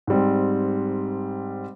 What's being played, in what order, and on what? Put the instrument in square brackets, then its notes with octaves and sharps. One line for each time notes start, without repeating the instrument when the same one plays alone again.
[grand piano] G#2 G3 C4